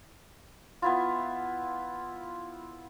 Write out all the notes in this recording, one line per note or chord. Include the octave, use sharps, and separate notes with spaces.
B3 E4 F4